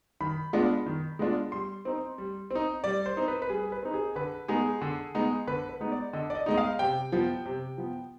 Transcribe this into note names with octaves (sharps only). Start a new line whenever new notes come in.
D#3 B5
G#3 B3 D4 F4
D#3
G#3 B3 D4 F4
G3 C6
C4 D#4
G3
C4 D#4
G3 D5
C5
C4 D#4
B4
B4
G3 G#4
B4
C4 D#4
G#4
D3 B4
G#3 B3 D#4 G#4
D3
G#3 B3 D#4
D3 B4
B4
G#3 B3 D#4
D5
D3 D#5
D5
D#5
G#3 B3 D#4 D#5
F5
C3 G5
F3 B3
C3
F3 B3